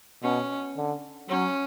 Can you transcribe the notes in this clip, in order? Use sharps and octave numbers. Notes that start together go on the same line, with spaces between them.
B2 C#4
D3
F#3 C#4